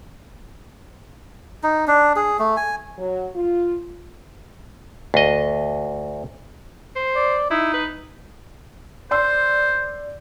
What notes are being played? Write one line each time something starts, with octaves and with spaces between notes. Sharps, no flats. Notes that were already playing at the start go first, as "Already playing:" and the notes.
D#4
D4
G#4
A3
G#5
F#3
F4
D2 D#5
C5
D5
D#4 E4
B4
C5 D5 C6 E6